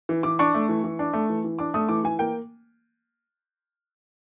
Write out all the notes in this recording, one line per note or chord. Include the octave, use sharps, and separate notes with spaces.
E3
E3 D6
D4 C#6
A3
E3
E3
D4
A3
E3
E3
D4 D6
A3 D#6
E3 D6
E3 G#5
A#3 G5